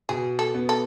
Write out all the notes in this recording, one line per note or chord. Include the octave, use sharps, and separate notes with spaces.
B2 G#4
A4
B3
A4